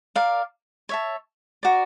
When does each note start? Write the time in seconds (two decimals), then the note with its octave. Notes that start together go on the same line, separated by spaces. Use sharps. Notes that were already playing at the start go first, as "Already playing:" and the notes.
0.15 A#4 D5 F5
0.89 C#5 E5 A5
1.63 F#4 A#4 D5